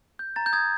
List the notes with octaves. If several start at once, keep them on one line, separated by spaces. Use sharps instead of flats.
G6
A#5 A6
G6
D#6 G#6